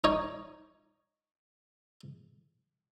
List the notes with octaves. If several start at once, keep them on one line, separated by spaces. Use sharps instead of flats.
D#4 C#5 D#5